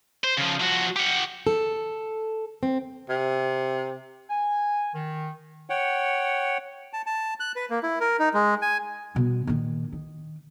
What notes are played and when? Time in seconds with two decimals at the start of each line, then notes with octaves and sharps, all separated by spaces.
0.24 C5
0.38 C#3 F3
0.61 F3 F#4
0.96 G4 F#5
1.47 A4
2.63 C4
3.09 C3
4.30 G#5
4.94 D#3
5.70 C#5 F#5 G5
6.93 A5
7.06 A5
7.40 F#6
7.56 B4
7.70 A#3
7.83 E4
8.00 A#4
8.19 D#4
8.34 G#3
8.62 G#5
9.15 B2 G3
9.47 A#2 D#3
9.92 D#3